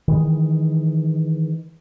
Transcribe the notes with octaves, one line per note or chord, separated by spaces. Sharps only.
D#3 E3 G#3